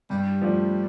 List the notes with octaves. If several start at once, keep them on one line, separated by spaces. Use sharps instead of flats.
G2 G3
F3 A3 D4